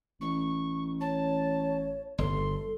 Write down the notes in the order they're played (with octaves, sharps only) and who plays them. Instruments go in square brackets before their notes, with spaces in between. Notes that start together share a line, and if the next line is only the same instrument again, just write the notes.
[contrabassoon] A1 [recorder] C#6
[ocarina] C#5 [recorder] A5
[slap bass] G1 [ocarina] A4 [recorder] C6